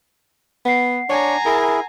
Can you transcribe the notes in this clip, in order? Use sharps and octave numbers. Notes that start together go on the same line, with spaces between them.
B3 F#5 C7
D4 C#5 G#5 A#5
E4 G#4 A#4